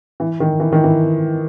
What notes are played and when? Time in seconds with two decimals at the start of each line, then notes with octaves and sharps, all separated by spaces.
0.20 E3
0.40 D#3
0.60 E3
0.72 D#3
0.84 E3